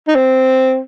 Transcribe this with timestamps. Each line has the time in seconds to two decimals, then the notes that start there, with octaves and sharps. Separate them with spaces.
0.08 D#4
0.15 C4